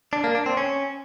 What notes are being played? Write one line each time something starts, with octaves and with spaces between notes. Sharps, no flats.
D4
A#3
D4
C4
C#4